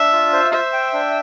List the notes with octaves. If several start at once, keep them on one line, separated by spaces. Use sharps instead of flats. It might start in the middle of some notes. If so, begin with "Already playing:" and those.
Already playing: D4 E5
F4
C5
C5 E5
G5
D4